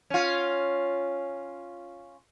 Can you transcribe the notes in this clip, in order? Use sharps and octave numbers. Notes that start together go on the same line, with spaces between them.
C#4 F4